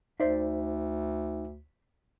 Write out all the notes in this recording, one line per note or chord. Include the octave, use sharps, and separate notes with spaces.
D2 D#4 C5 D5 E5